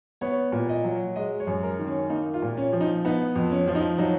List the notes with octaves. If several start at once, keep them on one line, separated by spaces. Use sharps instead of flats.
B3 C#5
A#2
D#5
F#3
G#3 D#5
C#5
F#2
A#4
D#3
C#4
A#3 D#4
F4
A#2
C#4
F3
D#4
B3 D#4
F2
C#4
F3
D#4
F#3 D#4